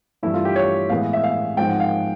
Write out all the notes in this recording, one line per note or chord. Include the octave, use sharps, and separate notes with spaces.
G2 E3 A3 E4
F4
G4
C#5
A2 E3 G#3 B3 F5
E5
F5
G#2 F3 G#3 C4 G5
F#5
F5